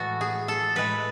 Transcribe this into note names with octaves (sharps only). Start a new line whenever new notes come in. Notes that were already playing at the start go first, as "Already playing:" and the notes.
Already playing: A2 E3 G#3 F#4 A4
G#4
A4
A2 G#3 B4